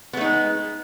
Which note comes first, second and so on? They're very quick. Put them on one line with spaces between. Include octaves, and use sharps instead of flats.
B3 A3 D#4 G#3